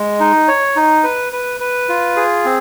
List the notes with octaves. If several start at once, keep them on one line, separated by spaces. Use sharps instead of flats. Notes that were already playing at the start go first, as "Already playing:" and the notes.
Already playing: G#3
D#4
C#5
D#4
B4
B4
B4
F4
G#4
C4